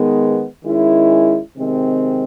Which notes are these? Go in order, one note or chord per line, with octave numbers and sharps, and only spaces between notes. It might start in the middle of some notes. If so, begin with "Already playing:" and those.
Already playing: D#3 G#3 B3
D#3 G#3 C#4 E4
C3 D#3 G#3 C4